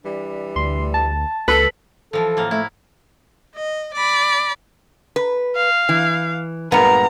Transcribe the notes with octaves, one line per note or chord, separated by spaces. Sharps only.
E3 G3 D4
D2 C6
A5
C#2 A4 B4
E3 F3 A4
A2 A#3
A3 E4
D#5
D5 B5
B4
F5
E3
G2 A#2 G#3 B3 A#5